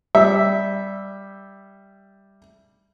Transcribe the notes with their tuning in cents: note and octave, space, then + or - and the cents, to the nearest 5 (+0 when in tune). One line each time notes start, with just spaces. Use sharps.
G3 +0 E5 +0